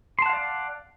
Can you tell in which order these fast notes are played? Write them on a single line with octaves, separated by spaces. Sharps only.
C6 A5 F#5 F5 D5